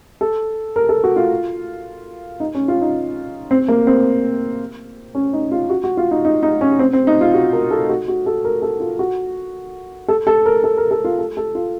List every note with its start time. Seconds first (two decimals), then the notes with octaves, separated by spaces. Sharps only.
0.21 A4
0.76 A#4
0.89 A4
1.04 F#4
1.16 F4
2.40 D#4
2.55 C#4
2.68 F4
2.81 D#4
3.51 C4
3.68 A#3
3.87 C4
5.15 C#4
5.33 D#4
5.52 F4
5.70 F#4
5.84 F#4
5.97 F4
6.11 D#4
6.25 D#4
6.43 D#4
6.61 C#4
6.79 C4
6.93 C4
7.07 D#4
7.21 F4
7.34 F#4
7.53 A#4
7.71 A4
7.89 F#4
8.08 F#4
8.26 A4
8.45 A#4
8.62 A4
8.80 F4
8.99 F#4
10.08 A4
10.27 A4
10.46 A#4
10.64 A4
10.77 A#4
10.91 A4
11.04 F4
11.19 A4
11.37 A4
11.55 F4